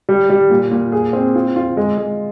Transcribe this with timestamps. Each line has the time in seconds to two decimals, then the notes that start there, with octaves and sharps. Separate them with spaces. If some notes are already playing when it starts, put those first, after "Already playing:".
0.09 G3
0.30 G3
0.51 A#2
0.72 A#2
0.92 G#4
1.13 C4
1.35 F4
1.56 F4
1.77 G#3
1.98 G#3